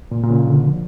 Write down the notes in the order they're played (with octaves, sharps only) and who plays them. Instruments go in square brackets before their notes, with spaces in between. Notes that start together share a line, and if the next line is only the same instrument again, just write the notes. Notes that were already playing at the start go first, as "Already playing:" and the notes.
[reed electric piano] A#2
A#2
C#3
D3
F3